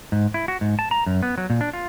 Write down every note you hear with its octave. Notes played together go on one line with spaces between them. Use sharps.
G#2
E4
F#4
G#2
A5
A#5
F#2
B3
F#3
A#2
D4
F4